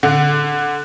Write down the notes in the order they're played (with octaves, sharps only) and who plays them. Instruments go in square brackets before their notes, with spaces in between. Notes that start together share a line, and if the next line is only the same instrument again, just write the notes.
[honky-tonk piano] D3